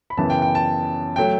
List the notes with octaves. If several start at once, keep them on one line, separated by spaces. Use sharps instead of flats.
B5
F#2 C#3 E3 B3 A5
G5
G5
A5
F#3 A3 G5